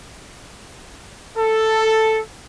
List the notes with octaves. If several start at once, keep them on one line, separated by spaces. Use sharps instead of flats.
A4